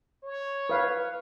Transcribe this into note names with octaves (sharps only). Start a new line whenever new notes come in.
C#5
B4 F5